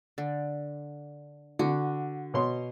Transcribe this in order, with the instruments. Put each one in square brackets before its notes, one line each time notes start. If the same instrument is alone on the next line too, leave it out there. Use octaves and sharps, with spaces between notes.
[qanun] D3
[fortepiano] D3 [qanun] F#4
[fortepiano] B2 C#5 C6